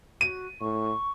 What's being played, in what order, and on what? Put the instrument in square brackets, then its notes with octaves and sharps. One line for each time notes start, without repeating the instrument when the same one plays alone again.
[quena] F#4 [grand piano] D#7
[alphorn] A2 [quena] C#6